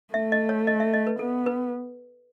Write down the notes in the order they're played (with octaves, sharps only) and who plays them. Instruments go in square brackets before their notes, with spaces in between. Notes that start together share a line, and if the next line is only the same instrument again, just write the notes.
[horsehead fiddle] A3 [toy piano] E5
[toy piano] D#5
C#5
D#5
E5
D#5
B4
[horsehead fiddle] B3 [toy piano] A4
[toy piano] B4